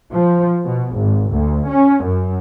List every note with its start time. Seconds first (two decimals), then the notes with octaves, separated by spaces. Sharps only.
0.12 F3
0.64 B2
0.95 G#1
1.32 D2
1.69 C#4
2.04 F#2